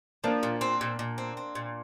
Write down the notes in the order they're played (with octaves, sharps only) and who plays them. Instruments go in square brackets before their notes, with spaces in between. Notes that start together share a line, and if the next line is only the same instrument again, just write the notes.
[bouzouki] F3 [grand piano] A#3 D4
[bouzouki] A#2
C4
A#2
A#2
C4
C4
A#2